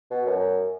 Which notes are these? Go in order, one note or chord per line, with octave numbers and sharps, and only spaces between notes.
B2
F#2